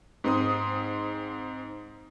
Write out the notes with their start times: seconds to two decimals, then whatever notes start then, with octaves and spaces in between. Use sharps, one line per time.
0.24 G#2 C4 D#6